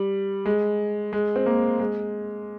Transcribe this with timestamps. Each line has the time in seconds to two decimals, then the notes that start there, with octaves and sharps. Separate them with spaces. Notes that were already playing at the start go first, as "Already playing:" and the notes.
Already playing: G3
0.46 G#3
1.13 G#3
1.36 C4
1.46 A#3
1.79 G#3